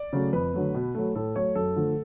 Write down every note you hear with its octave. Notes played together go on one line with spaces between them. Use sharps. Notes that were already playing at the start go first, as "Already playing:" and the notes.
Already playing: D5
C#3 F#3 A3
F2 B4
D3 F#3 A3
B2
F#3 A3
A2 A4
F#3 A3 C#5
F#2 A4
D3 F3 A3